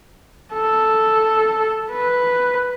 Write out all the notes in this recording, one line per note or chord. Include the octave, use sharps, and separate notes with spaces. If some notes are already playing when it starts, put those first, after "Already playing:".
A4
B4